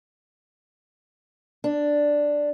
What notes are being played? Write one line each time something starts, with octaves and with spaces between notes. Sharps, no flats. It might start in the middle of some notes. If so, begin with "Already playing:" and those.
D4